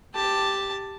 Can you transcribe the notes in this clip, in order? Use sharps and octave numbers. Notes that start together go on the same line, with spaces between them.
G4 A5